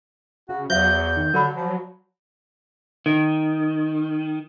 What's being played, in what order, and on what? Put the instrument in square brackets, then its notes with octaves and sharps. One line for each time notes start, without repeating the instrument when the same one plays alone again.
[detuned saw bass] C#3 [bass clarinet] F#4
[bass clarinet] E2 [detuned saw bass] F#3 [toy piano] C5 E5 F5 [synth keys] G6
[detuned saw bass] D#3
[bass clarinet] D3 [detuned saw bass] F#3 [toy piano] A#4 D5 B5
[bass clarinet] F3
[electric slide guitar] D#3